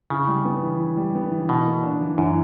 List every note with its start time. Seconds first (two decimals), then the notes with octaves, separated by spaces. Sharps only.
0.10 C#3 E4
0.28 G3
0.45 B3
0.63 E3
0.80 E4
0.97 G3
1.15 B3
1.32 E3
1.49 B2 E3
1.66 A#3
1.83 D4
2.01 E3
2.18 F#2 E3